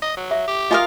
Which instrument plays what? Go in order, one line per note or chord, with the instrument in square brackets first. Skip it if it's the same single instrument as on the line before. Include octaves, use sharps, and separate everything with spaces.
[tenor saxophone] D#5
F#3
[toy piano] E5
[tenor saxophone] G4
[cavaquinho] F4 A#4 F5 [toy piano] D#5 G#5 D#6